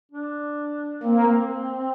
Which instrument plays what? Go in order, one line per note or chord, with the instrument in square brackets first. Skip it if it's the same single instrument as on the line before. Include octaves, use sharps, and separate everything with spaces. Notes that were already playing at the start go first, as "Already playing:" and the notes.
[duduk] D4
[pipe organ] A#3 [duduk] C4